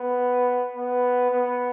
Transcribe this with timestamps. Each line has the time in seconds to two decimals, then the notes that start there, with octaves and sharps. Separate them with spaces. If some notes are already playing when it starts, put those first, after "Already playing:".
Already playing: B3
0.77 B3
1.31 B3